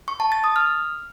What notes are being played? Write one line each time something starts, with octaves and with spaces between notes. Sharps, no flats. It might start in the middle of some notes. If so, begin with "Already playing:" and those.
C#6
A5
A6
D#6
F6